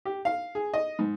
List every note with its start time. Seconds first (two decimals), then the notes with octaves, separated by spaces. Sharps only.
0.05 G4
0.25 F5
0.55 G#4
0.74 D#5
0.99 G#2